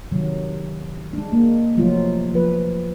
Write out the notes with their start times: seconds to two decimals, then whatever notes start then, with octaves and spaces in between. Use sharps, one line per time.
0.12 C3 D#3 F#3
1.13 G#3 D4
1.32 G#3 A#3
1.77 C3 F3 F#3 A3 F4
2.33 F3 B4